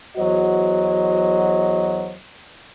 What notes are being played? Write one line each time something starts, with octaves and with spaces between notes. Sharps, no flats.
E2 F#3 F#4 C5 D#5